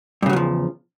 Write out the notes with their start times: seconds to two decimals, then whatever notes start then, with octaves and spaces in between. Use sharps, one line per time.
0.22 G2
0.26 C#3
0.29 F#3
0.33 E2
0.36 F3